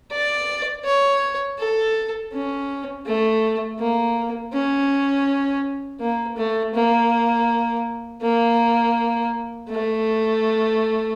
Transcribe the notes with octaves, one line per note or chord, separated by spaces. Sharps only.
D5
C#5
A4
C#4
A3
A#3
C#4
A#3
A3
A#3
A#3
A3